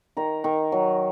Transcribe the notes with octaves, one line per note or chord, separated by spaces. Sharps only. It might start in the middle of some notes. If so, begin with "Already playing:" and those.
D#3 A#5
D#3
F#3